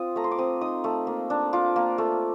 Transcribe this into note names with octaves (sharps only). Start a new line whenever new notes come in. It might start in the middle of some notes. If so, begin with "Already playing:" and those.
Already playing: C4 F4 D#6
A3 A#5
C6
D6
C4 D#6
D#4 D#6
A3
A#3
D4
F4 D6
A#3
A3